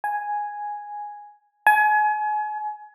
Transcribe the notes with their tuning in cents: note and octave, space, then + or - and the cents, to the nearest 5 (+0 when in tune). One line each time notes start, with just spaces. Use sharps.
G#5 +0
G#5 +30